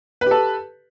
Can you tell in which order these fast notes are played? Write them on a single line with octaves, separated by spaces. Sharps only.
B4 G4 A4